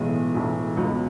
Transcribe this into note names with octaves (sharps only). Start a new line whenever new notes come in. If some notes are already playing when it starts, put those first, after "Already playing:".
Already playing: B1 A2 E3 G#3
B1 A2 E3
C#2 B2 F#3